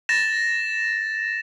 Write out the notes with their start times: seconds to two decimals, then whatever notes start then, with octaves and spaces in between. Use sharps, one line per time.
0.09 A6 A#6 E7